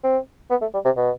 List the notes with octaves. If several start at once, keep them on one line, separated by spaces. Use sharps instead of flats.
C4
B3
A3
G3
C3
B2